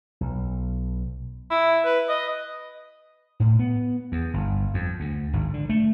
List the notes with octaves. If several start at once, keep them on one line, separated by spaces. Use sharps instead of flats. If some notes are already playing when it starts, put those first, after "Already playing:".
B1
E4
B4
D#5
A2
B3
E2
G1
F2
D2
G#1
D3
A3